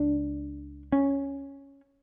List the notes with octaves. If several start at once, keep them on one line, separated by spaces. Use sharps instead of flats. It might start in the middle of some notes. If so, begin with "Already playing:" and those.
Already playing: C#2 D4
C#4